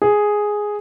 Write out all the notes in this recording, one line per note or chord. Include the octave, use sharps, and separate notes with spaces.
G#4